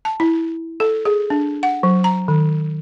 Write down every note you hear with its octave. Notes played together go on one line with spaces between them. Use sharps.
A5
E4
A4
G#4
D4
F#5
F#3
A#5
D#3